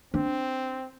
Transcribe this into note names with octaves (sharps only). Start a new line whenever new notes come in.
C4 D4